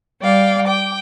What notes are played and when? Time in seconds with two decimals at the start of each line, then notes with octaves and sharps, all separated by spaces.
0.21 G3 D5 F5 G5
0.66 G5 D6